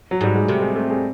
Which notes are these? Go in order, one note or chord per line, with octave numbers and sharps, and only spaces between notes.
F#3
G#2 G3
G#3
C3 A3
G#3
A3
G#3